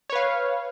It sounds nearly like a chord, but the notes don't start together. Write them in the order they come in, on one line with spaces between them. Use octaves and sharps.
C#5 B4 F5